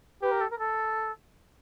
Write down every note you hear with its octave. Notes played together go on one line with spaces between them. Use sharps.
G4 B4
A#4
A4
A#4
A4